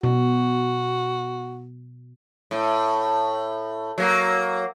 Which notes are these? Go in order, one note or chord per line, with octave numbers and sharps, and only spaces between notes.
B2 F#4
A2
F#3 A#3